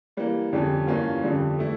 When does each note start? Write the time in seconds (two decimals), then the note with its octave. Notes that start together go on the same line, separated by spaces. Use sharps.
0.17 E3 G3 A#3
0.53 F2 D3 G3 C#4
0.87 G2 E3 A#3 C#4 F4
1.23 F2 D3 G3
1.59 E3 A3 E4